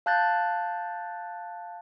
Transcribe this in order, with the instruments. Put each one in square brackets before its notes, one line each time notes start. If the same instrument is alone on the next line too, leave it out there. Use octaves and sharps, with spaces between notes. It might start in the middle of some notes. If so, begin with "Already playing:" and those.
[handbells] F5 A5 F#6 G6 A6